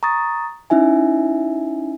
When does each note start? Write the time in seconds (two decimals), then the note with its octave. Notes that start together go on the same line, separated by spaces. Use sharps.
0.03 A#5 C#6 D#6 A6
0.70 C#4 D#4 E4 E5 G#5